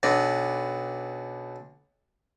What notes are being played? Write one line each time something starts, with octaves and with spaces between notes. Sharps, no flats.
B1 B2 D4